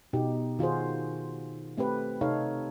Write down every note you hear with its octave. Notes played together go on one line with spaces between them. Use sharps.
B2 D#4 G4
D#3 F4 F#4 G#4 C5
A3 C4 G4 B4
C3 D#4 A4 C#5 F5